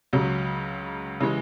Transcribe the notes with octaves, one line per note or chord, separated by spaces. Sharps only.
C#2 C#3 F#3
C#3 E3 G#3